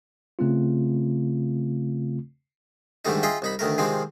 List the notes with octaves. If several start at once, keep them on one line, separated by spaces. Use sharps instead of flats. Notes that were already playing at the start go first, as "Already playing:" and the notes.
C#3 A3 C4 F4
G#2 D3 D#3 G3 A3 D#4
F4 G#4 D#5 E5 G5
C2 D#4 B5
D2 D#3 A3 A#4
C3 D#3 F3 G#3 C4